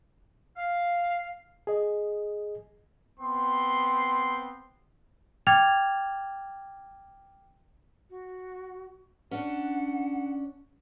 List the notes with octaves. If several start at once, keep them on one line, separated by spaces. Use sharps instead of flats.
F5
G#4 D#5
B3 C4 C6
G5 D6 F6 G#6 A6 F7
F#4
C#4 D4 F#5